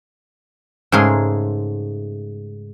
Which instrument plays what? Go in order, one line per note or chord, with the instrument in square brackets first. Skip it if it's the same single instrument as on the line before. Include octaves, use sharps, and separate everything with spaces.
[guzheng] G#2 C#3 A3 G#4 A#4 C6